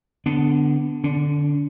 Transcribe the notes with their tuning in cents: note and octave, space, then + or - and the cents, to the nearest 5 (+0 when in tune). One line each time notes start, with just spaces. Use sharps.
D3 +0 B3 +20 D4 +0
D3 +5 D4 -35